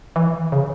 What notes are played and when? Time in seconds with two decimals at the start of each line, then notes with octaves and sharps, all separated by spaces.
0.16 E3
0.52 C#3